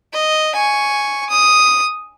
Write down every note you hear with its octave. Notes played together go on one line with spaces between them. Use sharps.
D#5
G#5 C#6
D#6